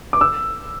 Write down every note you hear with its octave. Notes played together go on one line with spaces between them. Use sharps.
D6
E6